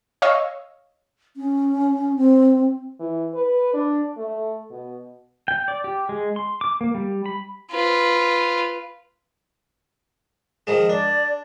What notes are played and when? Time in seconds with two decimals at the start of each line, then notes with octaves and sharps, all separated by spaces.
0.22 C#5 D#5 F5 C#6 E6
1.37 C#4
2.17 C4
3.00 E3
3.34 B4
3.74 D4
4.17 A3
4.71 B2
5.48 G5
5.68 D5
5.84 G4
6.09 G#3
6.36 C6
6.61 D6
6.81 A#3
6.95 G3
7.26 B5
7.71 F4 B4
10.67 D#3 F3 G#3
10.89 D4 D5